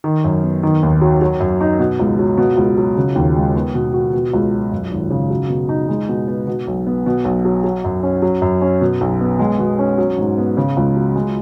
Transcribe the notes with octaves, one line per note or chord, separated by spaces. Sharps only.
D#3
F#2
B3
D#3
D#2
F#3
F#3
F#2
D#4
B2
C#2
F#3
B2
C#2
F#3
C#3
D#2
G#3
B3
B2
F#4
B2
C#2
F#3
F#2
G#1
C#3
F#3
B2
D#4
G#3
B2
B3
B2
B1
B3
B2
B1
F#3
F#3
F#2
C#4
F#3
F#2
C#4
B2
B1
B3
G#3
B2
C#4
F#3
G#2
B3
C#3
C#2
F#3
G#3